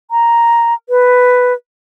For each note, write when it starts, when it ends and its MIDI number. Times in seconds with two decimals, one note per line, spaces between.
0.11 0.74 82
0.89 1.53 71